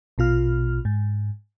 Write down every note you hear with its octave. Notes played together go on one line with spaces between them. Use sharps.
A#1 B2 F4 F6
G#2